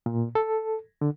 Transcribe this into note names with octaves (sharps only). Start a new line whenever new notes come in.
A#2
A4
D3